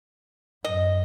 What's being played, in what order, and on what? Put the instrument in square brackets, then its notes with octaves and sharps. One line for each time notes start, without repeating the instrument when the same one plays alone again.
[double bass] F#2 [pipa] D#5